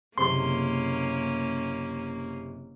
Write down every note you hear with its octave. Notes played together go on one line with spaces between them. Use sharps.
F#1 C3 A#3 C#4 C5 C6